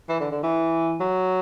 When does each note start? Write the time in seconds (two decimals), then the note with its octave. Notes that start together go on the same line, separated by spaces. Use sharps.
0.09 E3
0.20 D3
0.32 D3
0.43 E3
1.01 F#3